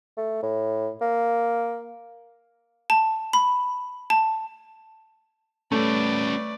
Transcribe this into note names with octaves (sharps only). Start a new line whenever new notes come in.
A3
A2
A#3
A5
B5
A5
G3 A3 C#4 B4 D5